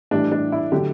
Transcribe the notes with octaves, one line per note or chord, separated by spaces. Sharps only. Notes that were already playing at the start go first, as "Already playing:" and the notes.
A2 E3 G3 D4
D4
E4
D3 F#3 A3 G4